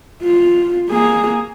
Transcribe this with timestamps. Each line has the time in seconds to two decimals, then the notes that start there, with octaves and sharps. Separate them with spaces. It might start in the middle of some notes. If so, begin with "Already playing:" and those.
0.23 F4
0.89 A#3 G#4